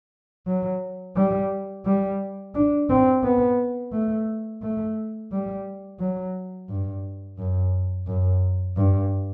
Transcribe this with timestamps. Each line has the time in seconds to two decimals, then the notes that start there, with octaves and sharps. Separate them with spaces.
0.47 F#3
1.16 G3
1.86 G3
2.54 D4
2.90 C4
3.24 B3
3.93 A3
4.62 A3
5.32 G3
6.00 F#3
6.69 G2
7.38 F#2
8.07 F#2
8.77 G2